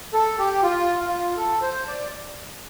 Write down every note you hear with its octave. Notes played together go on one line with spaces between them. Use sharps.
A4
G4
F4
F4
A4
C5
D5